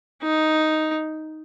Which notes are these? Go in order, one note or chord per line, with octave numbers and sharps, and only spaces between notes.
D#4